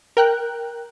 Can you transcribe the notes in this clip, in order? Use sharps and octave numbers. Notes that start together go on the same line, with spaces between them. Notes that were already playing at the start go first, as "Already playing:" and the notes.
A#4 G5 F#6